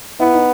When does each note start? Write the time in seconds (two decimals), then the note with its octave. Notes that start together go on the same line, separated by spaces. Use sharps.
0.20 B3 E4
0.33 D#4